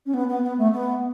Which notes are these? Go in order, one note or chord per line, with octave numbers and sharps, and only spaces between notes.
C#4
B3
B3
B3
A3
B3